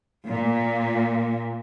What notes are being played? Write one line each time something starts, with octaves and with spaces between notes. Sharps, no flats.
A#2